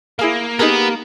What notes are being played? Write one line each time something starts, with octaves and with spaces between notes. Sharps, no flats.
A#3 E4 G#4 F5
B3 D#4 G4 G#4 A#4